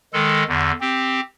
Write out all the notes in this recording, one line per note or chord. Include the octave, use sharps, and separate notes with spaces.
D#3 G#3 A4
E2 D3
C4 G4